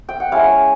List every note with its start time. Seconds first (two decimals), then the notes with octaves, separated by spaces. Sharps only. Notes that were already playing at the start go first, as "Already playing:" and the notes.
0.09 G5
0.20 F#5
0.32 G#3 C#4 E4 F5